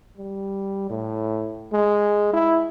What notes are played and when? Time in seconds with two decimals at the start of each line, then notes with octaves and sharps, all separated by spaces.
0.17 G3
0.90 A2
1.72 G#3
2.33 E4